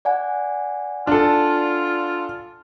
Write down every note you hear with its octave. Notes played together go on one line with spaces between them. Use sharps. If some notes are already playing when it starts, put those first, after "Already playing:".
D5 F#5 G#5
D4 F4 A4